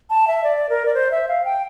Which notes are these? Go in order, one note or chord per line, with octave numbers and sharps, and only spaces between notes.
A5
E5
D5
A#4
D5
C5
E5
F5
G5